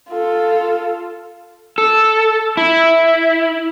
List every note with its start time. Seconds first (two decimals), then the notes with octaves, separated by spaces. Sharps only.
0.11 F4 A4
1.78 A4
2.57 E4